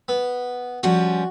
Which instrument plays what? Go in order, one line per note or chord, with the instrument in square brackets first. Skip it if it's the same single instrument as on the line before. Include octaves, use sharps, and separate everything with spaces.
[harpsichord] B3
[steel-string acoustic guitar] F3 G3 C#4 [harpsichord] F#4